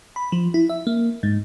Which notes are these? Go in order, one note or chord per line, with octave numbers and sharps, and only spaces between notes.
B5
F3
E4
E5
A#3
G#2